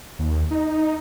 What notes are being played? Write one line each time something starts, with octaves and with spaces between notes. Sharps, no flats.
D#2
D#4